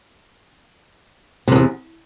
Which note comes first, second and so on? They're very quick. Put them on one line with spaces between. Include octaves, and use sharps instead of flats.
C3 G2 E2